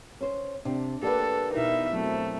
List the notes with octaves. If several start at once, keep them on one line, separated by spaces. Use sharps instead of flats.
C#4 C5
C3 D4
A#3 G4 A4 B4 D5 F#5
B2 D#4 E4 A#4 E5
F#3 A3 C4